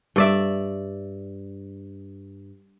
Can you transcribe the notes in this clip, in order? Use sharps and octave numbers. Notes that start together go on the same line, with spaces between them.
G2 D5 E5